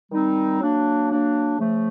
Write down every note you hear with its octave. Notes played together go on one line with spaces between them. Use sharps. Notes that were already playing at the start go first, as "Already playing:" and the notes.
D#3 G3 C4 D#4
F#3 A#3 D4
F#3 A#3 D4
C#3 F3 A3